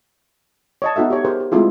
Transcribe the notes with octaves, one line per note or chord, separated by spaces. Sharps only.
C#5 D#5 A5
B3 D#4 F#4 A4 E5
G4 C#5
G4 G#4 A#4 C5
G4
G#3 A3 C4 E4 F4 G#4